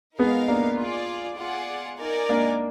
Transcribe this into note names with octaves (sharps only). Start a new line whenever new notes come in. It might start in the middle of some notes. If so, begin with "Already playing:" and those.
G#3 B3 D#4 A#4 F5
A#3 D4
F4 G#4 D5
F4 G#4 D5 F#5
D#4 A#4 D5 G#5
A#3 D4